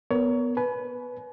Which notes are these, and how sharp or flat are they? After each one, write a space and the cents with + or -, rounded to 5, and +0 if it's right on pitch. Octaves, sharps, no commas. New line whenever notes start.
B3 +0 A#4 +0 C#5 +30
B4 +0 G#5 +40